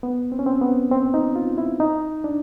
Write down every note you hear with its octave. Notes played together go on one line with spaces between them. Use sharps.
B3
C4
C#4
C4
B3
C4
D#4
F4
E4
D#4
D4